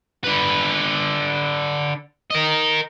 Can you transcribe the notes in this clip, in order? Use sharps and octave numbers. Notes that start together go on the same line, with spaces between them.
D3 B4
A#4 D#5